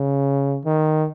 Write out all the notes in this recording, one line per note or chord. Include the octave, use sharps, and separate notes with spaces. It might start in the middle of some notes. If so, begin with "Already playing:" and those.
Already playing: C#3
D#3